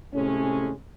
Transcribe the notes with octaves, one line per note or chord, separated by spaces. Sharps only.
A2 C3 G#3 A3 C#4